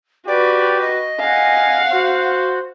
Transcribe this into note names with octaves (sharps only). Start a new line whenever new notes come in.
F#4 G4 B4 D5
D#5
F5 F#5 G#5
F#4 C5